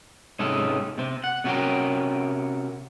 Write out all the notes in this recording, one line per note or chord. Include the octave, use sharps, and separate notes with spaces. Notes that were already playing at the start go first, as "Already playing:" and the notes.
G#2 C3 G#3 C#4 A4
C3 C4
F#5
C3 C#4 F#4 G4 A#4 G5